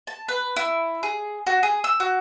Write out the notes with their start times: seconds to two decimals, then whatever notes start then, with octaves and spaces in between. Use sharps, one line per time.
0.07 A5
0.28 B4
0.56 E4
1.03 G#4
1.47 F#4
1.63 G#4
1.84 E6
2.00 F#4